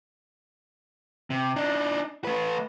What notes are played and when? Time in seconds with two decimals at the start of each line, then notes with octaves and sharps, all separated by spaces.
1.30 C3
1.56 D4 D#4
2.24 A3 B4